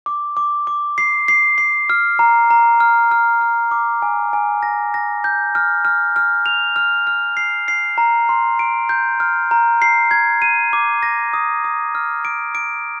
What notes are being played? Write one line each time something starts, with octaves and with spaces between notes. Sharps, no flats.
D6
D6
D6
C7
C7
C7
F6
A#5
A#5
F6
F6
F6
D6
G#5
G#5
A#6
A#6
G6
F6
F6
F6
F7
F6
F6
C7
C7
A#5
C6
D7
G6
F6
A#5
C7
G#6
D#7
D6
A#6
D#6
D#6
F6
D7
D7